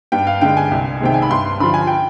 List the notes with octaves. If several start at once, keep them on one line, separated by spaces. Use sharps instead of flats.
G2 G5
F5
D3 G#3 G5
G#5
C2
C3 D#3 G#3 G5
G#5
B5
G2 C6
D3 F3 B5
G#5
G5